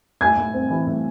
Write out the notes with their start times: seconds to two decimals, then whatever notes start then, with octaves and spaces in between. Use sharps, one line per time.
0.21 A2 G#5 G#6
0.37 A2
0.54 C4
0.70 E3
0.87 A2